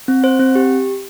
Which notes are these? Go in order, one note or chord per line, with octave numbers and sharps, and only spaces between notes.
C4
C5
C4
G4